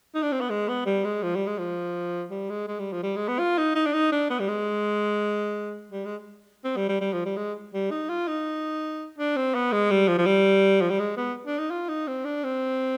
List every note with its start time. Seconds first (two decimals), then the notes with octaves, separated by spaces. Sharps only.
0.15 D#4
0.23 D4
0.32 C4
0.41 B3
0.50 G#3
0.68 B3
0.86 G3
1.05 G#3
1.23 F3
1.35 G3
1.47 G#3
1.58 F3
2.31 G3
2.50 G#3
2.68 G#3
2.79 G3
2.92 F3
3.03 G3
3.16 G#3
3.28 B3
3.39 F4
3.58 D#4
3.75 D#4
3.86 D4
3.93 D#4
4.12 D4
4.30 B3
4.40 G3
4.48 G#3
5.92 G3
6.05 G#3
6.65 C4
6.76 G3
6.89 G3
7.01 G3
7.13 F3
7.25 G3
7.37 G#3
7.74 G3
7.91 D#4
8.09 F4
8.28 D#4
9.18 D4
9.36 C4
9.55 B3
9.72 G#3
9.91 G3
10.08 F3
10.18 F3
10.26 G3
10.81 F3
10.90 G3
10.99 G#3
11.17 B3
11.47 D4
11.59 D#4
11.70 F4
11.89 D#4
12.08 C4
12.25 D4
12.44 C4